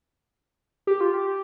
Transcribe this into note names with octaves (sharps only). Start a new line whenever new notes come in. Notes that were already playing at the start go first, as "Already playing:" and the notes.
G4
F4
G4